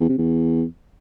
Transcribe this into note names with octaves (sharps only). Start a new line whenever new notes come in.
E2
C3
E2